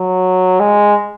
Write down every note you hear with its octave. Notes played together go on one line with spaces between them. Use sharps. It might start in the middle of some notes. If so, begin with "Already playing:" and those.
Already playing: F#3
G#3